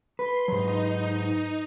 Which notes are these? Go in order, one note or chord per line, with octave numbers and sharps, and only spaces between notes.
B4 C6
G#2 F#3 D#4